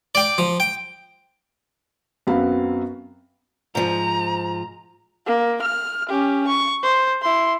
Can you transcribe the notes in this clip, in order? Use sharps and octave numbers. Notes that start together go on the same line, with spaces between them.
D5 G5
F3
G5
F#2 B3 C4 F#4 F5 B5
G#2 F3 A#5
A#3
F6
C#4 G4
C#6
C5
E4 C6